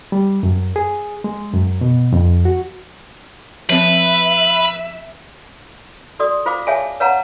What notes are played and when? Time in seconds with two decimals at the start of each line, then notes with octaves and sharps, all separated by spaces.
0.12 G3
0.43 F#2
0.76 G#4
1.24 G#3
1.53 F#2
1.81 B2
2.12 F2
2.45 F#4
3.69 F3 C4 B4 E5
6.19 F#4 A4 D5 D#6
6.46 F4 C5 F5 D6
6.67 G#4 C#5 E5 F5 G#5 A5
7.00 B4 C#5 F5 F#5 A5 A#5